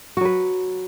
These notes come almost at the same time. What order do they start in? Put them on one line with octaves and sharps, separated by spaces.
F#4 F#3 B4